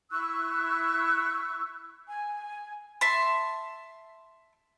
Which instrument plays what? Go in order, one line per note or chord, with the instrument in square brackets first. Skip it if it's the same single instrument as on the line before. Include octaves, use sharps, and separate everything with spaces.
[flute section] E4 C#6 E6 F#6
G#5
[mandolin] E5 A5 C6